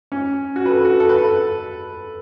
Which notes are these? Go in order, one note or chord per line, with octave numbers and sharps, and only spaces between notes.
C#4
F#4
B4
A4
F#4
A4
B4
A4